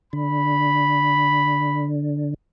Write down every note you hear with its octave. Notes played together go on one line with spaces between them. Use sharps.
D3 B5